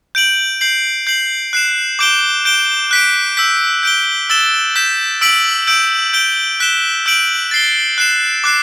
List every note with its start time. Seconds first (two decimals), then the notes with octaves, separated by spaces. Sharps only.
0.15 G6 D7 F#7
0.61 G6 C7 F#7
1.07 G6 C7 F#7
1.53 F#6 C7 E7
1.99 D6 G6 D7 G7
2.45 G6 D7 G7
2.91 F#6 B6 D7
3.37 E6 G6 B6
3.83 G6 D7 G7
4.29 E6 A6 E7 G7
4.76 G6 B6 E7
5.21 E6 B6 D7 F#7
5.67 E6 G6 D7
6.13 G6 D7 G7
6.60 F#6 B6 E7 G7
7.06 E6 G6 D7 F#7
7.51 A6 C7 G7
7.98 F#6 C7 E7
8.44 D6 F#6 C7